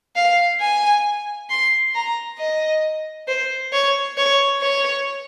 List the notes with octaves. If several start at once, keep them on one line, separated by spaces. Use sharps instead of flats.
F5
G#5
C6
A#5
D#5
C5
C#5
C#5
C#5